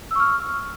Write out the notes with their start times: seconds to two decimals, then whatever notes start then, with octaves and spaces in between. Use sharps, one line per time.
0.11 E6
0.15 C#6
0.20 F6